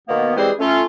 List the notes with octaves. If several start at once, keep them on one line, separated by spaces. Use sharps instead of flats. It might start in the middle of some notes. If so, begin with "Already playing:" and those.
B2 D#3 A#3 B3
E3 G3 G#3 C4 G#4 C5
A3 C#4 F4